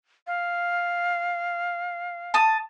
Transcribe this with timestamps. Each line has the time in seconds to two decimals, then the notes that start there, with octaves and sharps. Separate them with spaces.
0.27 F5
2.34 A5 D#6